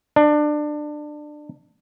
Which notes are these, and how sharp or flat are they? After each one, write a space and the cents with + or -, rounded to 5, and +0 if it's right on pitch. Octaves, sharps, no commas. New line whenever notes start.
D4 +25